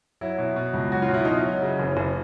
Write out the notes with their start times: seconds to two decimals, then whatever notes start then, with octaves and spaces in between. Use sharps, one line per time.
0.21 F#3 E4
0.38 B2
0.56 B2
0.74 C#2
0.92 F#3 F#4
1.02 F4
1.09 B2
1.14 E4
1.24 F#3 D#4 F4
1.44 F#3
1.62 C#3
1.80 F#1
1.97 F#1